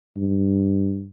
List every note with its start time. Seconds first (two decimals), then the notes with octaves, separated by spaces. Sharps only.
0.17 G2